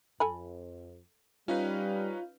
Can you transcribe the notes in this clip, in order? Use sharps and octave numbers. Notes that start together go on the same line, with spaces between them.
F2 A4 G#5 B5
G3 C#4 D#4 F4 B4 F5